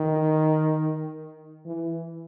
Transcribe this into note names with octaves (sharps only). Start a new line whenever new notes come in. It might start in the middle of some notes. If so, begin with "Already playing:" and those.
Already playing: D#3
E3